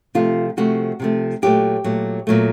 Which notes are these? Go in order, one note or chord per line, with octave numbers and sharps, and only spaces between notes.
C3 F3 A3 F4
C3 F3 A3 F#4
C3 F3 A3
A#2 F#3 A3 G4
A#2 F#3 A3
A#2 F#3 A3